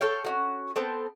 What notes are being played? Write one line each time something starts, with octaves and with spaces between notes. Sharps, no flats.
A4 C#5 F5 G5
C#4 D#4 F#4
B3 C4 A4